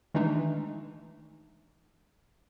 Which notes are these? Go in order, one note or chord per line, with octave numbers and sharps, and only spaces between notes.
D#3 E3 G#3 A3 D4 D#4